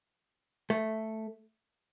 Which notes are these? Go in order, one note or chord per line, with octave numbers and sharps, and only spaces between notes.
A3